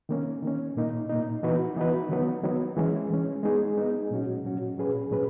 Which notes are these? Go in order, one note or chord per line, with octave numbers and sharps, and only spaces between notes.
D#3 A#3 C#4
D#3 A#3 C#4
A#2 A#3 D#4
A#2 A#3 D#4
E3 B3 D#4 F#4 B4
E3 B3 D#4 F#4 B4
D#3 F#3 B3
D#3 F#3 B3
E3 G#3 C#4
E3 G#3 C#4
G#3 B3 D#4 G#4
G#3 B3 D#4 G#4
A#2 F#3 C#4 F#4
A#2 F#3 C#4 F#4
A#2 F#3 C#4 G#4 B4
A#2 F#3 C#4 G#4 B4